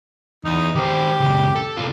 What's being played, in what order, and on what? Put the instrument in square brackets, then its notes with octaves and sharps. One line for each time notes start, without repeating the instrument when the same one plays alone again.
[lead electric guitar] E2 [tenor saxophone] D#4
[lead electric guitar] D#3 C5 [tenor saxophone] G4
[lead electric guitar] C#2 F#2
A4
C2 F4